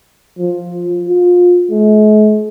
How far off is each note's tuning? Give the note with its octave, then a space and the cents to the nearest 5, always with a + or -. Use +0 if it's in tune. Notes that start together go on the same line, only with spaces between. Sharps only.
F3 +5
F4 +25
G#3 +45